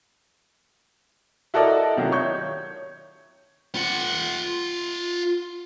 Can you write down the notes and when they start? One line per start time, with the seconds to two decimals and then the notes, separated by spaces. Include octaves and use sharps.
1.54 E4 F#4 A4 A#4 D5 D#5
1.96 C3 D#3 F#3 E4 F4
2.12 C#5 C#6 G6
3.75 F4 F#5